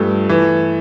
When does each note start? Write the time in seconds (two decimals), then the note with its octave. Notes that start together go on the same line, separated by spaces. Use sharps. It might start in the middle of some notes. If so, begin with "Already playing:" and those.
Already playing: G2 F3 A3
0.29 E3